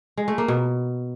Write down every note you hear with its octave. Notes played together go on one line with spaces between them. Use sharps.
G#3
A3
A#3
B2